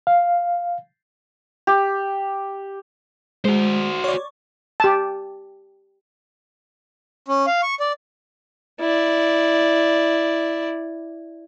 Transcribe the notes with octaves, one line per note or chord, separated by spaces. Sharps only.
F5
G4
G#3 F#4 C5
C#5 D5
G4 A5
C#4
F5
C#6
D5
E4 D5